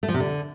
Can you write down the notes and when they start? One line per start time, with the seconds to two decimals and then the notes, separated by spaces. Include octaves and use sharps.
0.03 A3
0.09 F3
0.14 C3
0.20 D3